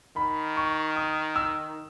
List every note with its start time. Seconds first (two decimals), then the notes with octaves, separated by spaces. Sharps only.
0.16 D#3 B5
0.57 C#6
0.96 D#6
1.36 E6